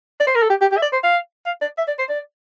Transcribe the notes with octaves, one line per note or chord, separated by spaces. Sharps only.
D5
C5
A#4
A4
G4
G4
G4
E5
D5
C5
F5
F5
D5
E5
D5
C5
D5